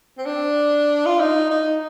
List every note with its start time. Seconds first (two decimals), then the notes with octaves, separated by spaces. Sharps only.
0.18 C4
0.26 D4
1.06 F4
1.20 D#4
1.51 D#4